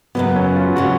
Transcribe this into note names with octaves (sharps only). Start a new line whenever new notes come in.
F#2 C#3 F#3 B3
C#4
F4
C#3 F#3 F#4